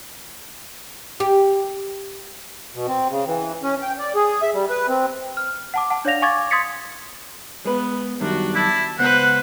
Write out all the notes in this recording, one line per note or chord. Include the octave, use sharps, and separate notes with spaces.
G4
B2
C4
C#3
E3
C#4
G5
D5
G#4
E5
G3
B4
C4
F6
F#5 A5 D6
F#5 A5
D4 C#5 D5 F5 A#6 F7
F5 G#5 C#6 D6 G#6 A6
C6 D#6 G#6 A6 B6 C#7
G#3 B3 B4
F#2 D#3 G3 D4 F#4
E4 A5
C#2 B3 B4 C5 F#5